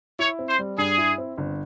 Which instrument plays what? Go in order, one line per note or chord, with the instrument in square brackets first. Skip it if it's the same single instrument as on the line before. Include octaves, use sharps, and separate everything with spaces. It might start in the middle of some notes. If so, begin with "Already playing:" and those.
[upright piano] E4 [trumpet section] C#5
[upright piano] C4
[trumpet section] C5
[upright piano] G3
[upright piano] G2 [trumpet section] G#4
[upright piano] E4
C4
G1